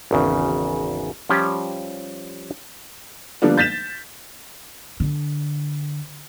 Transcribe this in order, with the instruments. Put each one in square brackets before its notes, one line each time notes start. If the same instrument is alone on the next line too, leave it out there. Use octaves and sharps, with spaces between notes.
[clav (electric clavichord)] G#1 E2 C#3
F3 G3 C#4 F4 G4
[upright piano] D3 F3 G3 A#3 B3 D4
G6 A6 B6 E7
[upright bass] D3